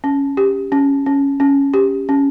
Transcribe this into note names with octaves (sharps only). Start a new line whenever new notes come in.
C#4
G4
C#4
C#4
C#4
G4
C#4